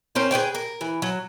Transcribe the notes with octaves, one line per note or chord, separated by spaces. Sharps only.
C4 C#4 A#4 C5
G#4 B4 C#5 G5
A#4
E3
F#3